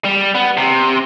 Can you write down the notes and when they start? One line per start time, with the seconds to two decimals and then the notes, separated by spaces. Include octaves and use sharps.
0.05 G3
0.35 B3
0.57 C3